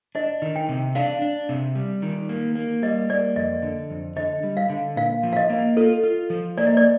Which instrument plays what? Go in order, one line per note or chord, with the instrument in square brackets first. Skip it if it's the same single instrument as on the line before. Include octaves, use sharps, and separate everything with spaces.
[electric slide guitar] D4 [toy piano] D#5
[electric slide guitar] D#3
[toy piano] G5
[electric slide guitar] C3
[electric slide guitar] D4 [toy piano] F5
[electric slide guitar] D4
C3
G3
D#3
A#3
A#3
[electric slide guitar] G3 [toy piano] D#5
[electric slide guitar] A#3 [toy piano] D5
[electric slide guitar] F2 [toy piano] D#5
[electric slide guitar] D3
F2
[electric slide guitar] D3 [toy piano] D#5
[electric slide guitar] G3
[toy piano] F5
[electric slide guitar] D3
[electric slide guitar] A#2 [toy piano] F5
[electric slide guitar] F3
[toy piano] F5
D#5
[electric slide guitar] A#3
[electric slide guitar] F4 [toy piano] A4
[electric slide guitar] F4
F3
[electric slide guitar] A#3 [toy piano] D5
[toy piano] D#5
D5